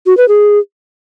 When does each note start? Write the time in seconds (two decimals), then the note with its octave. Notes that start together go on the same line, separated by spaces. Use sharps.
0.06 F#4
0.17 B4
0.28 G#4